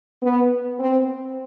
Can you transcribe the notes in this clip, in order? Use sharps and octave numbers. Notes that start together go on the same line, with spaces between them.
B3
C4